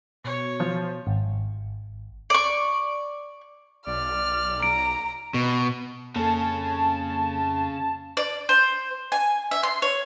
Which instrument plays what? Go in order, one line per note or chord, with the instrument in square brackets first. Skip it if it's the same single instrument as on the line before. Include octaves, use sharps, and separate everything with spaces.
[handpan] B2 [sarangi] C#5
[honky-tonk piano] F3
[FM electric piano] G#1
[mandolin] D5 C#6
[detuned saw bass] B1 [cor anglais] D5 [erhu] F6
[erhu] A#5 [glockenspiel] D7
[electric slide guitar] B2
[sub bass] F2 [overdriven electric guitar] C#3 C#4 [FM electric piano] A#3 A4 [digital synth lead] A5
[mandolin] D5
C5
G#5
E5
C6
C#5